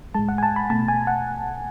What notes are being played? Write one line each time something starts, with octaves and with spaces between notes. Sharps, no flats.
A2 G#3 A5
F#5
G#5
A5
B5
B2 A3 A5
G#5
F#5